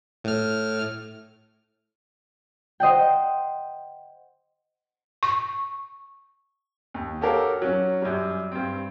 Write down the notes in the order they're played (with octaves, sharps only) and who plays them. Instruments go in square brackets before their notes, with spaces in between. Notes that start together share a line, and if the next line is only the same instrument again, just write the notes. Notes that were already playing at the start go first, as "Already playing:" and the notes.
[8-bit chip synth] A2 F6
[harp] C5 D#5 F#5 G5
[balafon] C#6
[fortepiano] D#2
F#4 G4 A4 A#4 C#5 F5
F#3 C#4
F#2 G3
G2 C4